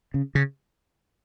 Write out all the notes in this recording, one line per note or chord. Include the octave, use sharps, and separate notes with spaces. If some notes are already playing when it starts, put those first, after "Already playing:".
C#3
C#3